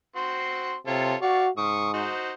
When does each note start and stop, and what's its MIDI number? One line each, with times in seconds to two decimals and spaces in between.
0.16 0.75 60
0.16 0.75 66
0.16 0.75 84
0.87 1.15 48
0.87 1.15 65
0.87 1.15 69
0.87 1.15 73
1.22 1.50 66
1.22 1.46 74
1.22 1.46 77
1.22 1.46 85
1.58 2.09 44
1.58 1.90 85
1.58 1.90 87
1.94 2.31 63
1.94 2.31 66
1.94 2.31 72